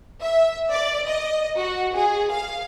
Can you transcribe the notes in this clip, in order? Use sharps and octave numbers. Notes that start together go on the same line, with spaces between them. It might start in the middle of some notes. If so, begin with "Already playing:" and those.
E5
D5
D#5
F#4
G#4
F5